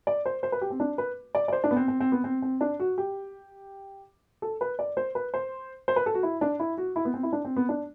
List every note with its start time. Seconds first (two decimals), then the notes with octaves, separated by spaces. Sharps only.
0.07 D5
0.26 C5
0.43 C5
0.52 B4
0.61 G4
0.70 C4
0.80 D4
0.98 B4
1.35 D5
1.48 D5
1.52 C5
1.64 D4
1.71 B3
1.77 C4
1.88 C4
2.00 C4
2.12 B3
2.24 C4
2.42 C4
2.61 D4
2.80 F#4
2.98 G4
4.42 A4
4.61 B4
4.79 D5
4.97 C5
5.15 B4
5.34 C5
5.88 C5
5.96 B4
6.06 A4
6.14 F#4
6.23 E4
6.41 D4
6.60 E4
6.78 F#4
6.96 E4
7.05 B3
7.14 C4
7.23 E4
7.33 D4
7.45 C4
7.56 B3
7.69 D4